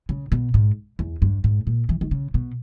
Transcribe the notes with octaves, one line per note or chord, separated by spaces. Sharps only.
C#3
B2
G#2
E2
G2
G#2
A#2
E3
D#3
C#3
B2